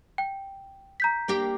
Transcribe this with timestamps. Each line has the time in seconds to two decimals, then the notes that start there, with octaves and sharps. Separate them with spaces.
0.18 G5
1.00 A#5 G6 B6
1.28 A#3 D4 G4